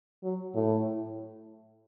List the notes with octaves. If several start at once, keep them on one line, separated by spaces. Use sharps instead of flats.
F#3
A2